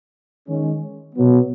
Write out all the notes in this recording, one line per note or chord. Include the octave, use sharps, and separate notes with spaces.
D#3 G#3 C#4
B2 F#3 B3